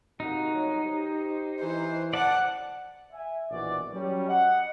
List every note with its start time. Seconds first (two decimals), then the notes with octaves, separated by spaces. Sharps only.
0.20 C3 A#3 D#4 F#4
0.53 G1 G2 F#3
0.84 G4 C5
1.61 E3 C5
2.13 D5 F#5 A5
3.12 E5 G#5
3.50 A#1 B2 E3 F#4 D5
3.91 F#3 G3 C#4
4.28 D#5 F#5